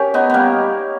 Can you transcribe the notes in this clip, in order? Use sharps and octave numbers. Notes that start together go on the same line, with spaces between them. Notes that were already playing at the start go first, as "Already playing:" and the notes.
Already playing: C#4 G4 A#4 C#5
B3 D#4
G3 A#3 B3